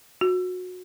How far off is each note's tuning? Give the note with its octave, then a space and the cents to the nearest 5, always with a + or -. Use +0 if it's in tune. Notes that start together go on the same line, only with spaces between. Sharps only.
F#4 -25